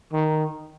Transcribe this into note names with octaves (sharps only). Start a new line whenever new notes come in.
D#3